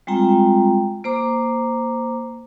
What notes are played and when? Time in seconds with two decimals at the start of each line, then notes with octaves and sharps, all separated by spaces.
0.07 G3 G#3 C4 F4 G5 A#5
1.04 A#3 C5 A#5 D6